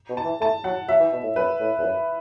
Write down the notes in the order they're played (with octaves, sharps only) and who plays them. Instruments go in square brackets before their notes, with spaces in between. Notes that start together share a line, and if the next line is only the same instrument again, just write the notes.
[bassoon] B2
[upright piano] A5
[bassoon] E3
[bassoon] A3 [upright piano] A5
[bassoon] F#3 [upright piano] F#5
[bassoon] F#3 [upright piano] E5
[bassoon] E3
B2
A2
[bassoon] F#2 [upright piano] B4
[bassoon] A2
E2
F#2